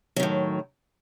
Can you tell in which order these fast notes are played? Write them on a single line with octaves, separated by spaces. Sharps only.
F#3 D#3 A2